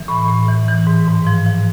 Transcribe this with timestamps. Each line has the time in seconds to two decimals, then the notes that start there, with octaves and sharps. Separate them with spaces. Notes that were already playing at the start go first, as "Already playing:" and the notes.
Already playing: E3
0.08 A2 B5
0.28 A2
0.49 E3
0.68 E3
0.87 G#2
1.08 G#2
1.27 F3
1.46 F3